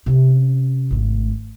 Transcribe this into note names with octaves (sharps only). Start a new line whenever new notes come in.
C3 C#4
G#1 A3